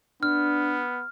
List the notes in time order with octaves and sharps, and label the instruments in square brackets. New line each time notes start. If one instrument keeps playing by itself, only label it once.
[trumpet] B3 [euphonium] D4 [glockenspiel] F6